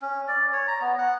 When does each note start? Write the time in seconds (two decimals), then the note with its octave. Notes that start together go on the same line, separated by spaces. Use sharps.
0.02 C#4
0.28 D5
0.53 C#5
0.68 A#5
0.81 B3
0.98 F#5